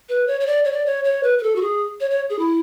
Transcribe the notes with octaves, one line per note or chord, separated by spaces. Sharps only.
B4
C#5
C#5
D5
C#5
D5
C#5
C#5
B4
B4
A4
F#4
G#4
C#5
C#5
G#4
E4